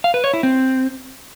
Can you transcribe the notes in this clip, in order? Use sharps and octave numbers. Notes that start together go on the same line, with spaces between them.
F5
B4
C#5
E4
C4